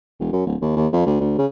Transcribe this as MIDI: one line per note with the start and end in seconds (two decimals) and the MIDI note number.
0.20 0.32 28
0.33 0.44 42
0.46 0.56 26
0.61 0.73 39
0.76 0.87 39
0.93 1.04 41
1.06 1.18 38
1.21 1.37 38
1.38 1.46 49